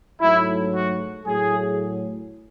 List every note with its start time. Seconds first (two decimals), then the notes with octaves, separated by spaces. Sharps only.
0.21 G#2 F#3 A3 E4
0.73 F#4
1.26 A2 F#3 A3 G#4